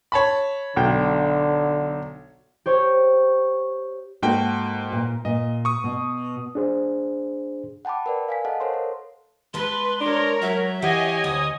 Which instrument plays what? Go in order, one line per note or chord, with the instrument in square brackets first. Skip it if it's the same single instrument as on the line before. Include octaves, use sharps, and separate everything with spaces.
[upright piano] C#5 A5 B5
[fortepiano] B1 G5 [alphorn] D3
[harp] G4 C5 C#5
[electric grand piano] G#2 G5 [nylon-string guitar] A#3 F#4 A4
[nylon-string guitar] A#2
[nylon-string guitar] A#2 [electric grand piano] D#5
[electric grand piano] C#6 D#6
[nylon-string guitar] B2
[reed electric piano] D4 G#4 C5
[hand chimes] F#5 G5 A5 B5 D6
A#4 B4 D5
F5 G#5 B6
A4 D#5 F5 F#5 A5
A4 A#4 C5 C#5 C6
A#4
[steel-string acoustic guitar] G#3 A5 [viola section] B4 [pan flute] C6
[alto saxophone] D4 [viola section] A#4 C#5 A#5
[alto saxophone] F#3 [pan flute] E5
[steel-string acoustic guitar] E3 F5 F#5 [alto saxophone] G4 [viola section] C#5 D#5 G#5
[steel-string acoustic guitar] D2 [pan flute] D#6